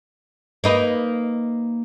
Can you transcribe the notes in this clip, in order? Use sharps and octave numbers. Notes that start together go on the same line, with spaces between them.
A#3 D#4 B4